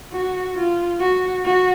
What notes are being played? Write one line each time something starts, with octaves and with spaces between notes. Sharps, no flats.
F#4
F4
F#4
F#4